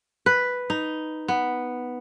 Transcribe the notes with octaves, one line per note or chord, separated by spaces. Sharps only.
B4
D#4
B3